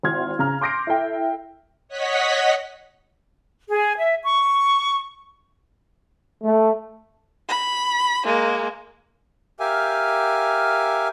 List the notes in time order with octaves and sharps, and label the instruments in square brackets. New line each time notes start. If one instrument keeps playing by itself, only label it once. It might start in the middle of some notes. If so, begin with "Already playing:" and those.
[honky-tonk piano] G#1 E4 F#4 C6 F6 G#6
C#3 A#5 F6
C6 D6 G6 A#6 C7 D7
E4 A4 E5 G5
[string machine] C#5 D#5 F#5 B6
[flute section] G#4
E5
C#6
[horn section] A3
[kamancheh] B5
G#3 A#3
[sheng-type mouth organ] G4 A#4 E5 F5 G#5